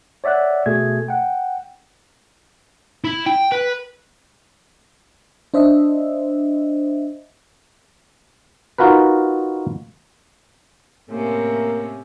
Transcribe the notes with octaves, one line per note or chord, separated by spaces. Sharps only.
C#5 D5 E5 F#5 F#6
B2 A3 G#4 G#6
F#5 G5
E4
G5
B4
D4 C5 D#5 E5
D#4 F4 F#4 A#4 B4
A2 C3 A#3 C#4